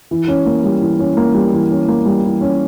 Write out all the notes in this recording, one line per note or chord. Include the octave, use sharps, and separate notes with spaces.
E3
C#4
A#3
G3
E3
C#4
A#3
G3
E3
C#4
A#3
G3
E3
C#4